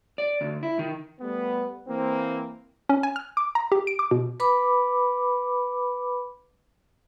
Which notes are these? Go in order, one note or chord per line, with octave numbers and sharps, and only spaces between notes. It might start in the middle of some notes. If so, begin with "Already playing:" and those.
D5
D2
E4
D#3
G3 A3 B3
E3 A#3 C4
C#4
G#5
F6
D6
A#5
G4
D7
D6
B2
B4 B5 D6